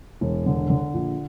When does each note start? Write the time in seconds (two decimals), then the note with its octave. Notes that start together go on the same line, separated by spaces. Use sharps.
0.21 E1
0.46 D3
0.70 D3
0.94 A#1